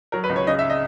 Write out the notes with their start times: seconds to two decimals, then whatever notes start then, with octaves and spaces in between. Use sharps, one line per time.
0.12 F#3 A#4
0.24 B4
0.30 C#2
0.36 C#5
0.47 C#3 D#5
0.59 E5
0.70 D#5